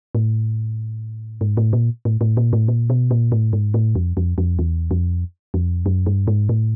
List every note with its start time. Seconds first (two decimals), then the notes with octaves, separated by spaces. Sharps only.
0.15 A2
1.41 G#2
1.57 A2
1.73 A#2
2.05 A2
2.21 A2
2.37 A#2
2.53 A2
2.68 A#2
2.90 B2
3.11 A#2
3.32 A2
3.53 G#2
3.74 A2
3.95 F2
4.17 F2
4.38 F2
4.59 E2
4.91 F2
5.54 F2
5.86 F#2
6.06 G2
6.28 G#2
6.49 A2